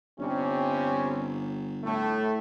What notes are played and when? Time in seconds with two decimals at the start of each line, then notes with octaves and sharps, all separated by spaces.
0.19 G1 C3 G3 C#4
1.83 A2 A3